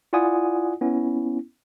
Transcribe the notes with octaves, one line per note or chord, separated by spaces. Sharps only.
E4 F4 D5 F#5 G#5 D#6
B3 C#4 E4